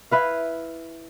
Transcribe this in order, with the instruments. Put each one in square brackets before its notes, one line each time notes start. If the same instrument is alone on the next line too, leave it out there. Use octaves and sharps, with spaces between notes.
[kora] E4 B4 F5